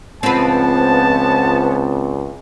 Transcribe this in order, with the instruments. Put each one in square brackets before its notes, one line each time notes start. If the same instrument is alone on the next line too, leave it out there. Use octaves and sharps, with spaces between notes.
[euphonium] C#2 [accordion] F3 B3 [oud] C4 B4 [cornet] A5